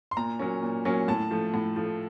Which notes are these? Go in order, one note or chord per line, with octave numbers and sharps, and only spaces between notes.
C6
A#2 A#5
F#3 A#3 C#4
A#2
F#3 A#3 C#4
A2 A5
F3 A3
A2
F3 A3